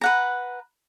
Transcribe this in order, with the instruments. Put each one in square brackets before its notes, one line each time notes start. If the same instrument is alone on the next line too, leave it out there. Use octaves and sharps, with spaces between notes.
[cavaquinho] B4 F#5 A#5